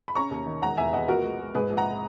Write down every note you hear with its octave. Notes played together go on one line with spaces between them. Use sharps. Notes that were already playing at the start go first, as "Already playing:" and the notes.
B5
C#4 A#5 C#6
D#2
D#3
E1 F#5 A#5
E2 E5 G#5
E2 D#5 F#5
A#1 F#4 A#4
G#3
G#3
G#2 G#4 B4
A#1
F#5 A#5